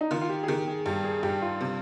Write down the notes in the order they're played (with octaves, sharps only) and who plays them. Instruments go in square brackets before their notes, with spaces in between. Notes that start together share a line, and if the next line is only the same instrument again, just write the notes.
[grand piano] D#4
[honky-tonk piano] D#3 [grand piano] F4
[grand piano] F4
G4
G#4
[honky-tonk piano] D#3 [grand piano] G4
[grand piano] G#4
[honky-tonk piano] G2 [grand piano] G4
[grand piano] G#4
[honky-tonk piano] G2 [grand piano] G4
[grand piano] F4
[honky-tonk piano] C3